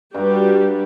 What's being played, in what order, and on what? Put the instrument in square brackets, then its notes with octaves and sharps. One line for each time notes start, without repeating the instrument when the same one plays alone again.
[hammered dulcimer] G2 A#5 [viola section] G3 F#4 G4